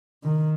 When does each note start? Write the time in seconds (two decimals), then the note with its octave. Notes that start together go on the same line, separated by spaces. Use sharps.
0.23 D#3